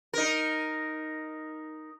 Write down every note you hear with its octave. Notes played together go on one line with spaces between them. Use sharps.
D#4 A#4